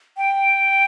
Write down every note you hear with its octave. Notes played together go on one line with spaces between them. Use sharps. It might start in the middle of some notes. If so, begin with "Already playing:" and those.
G5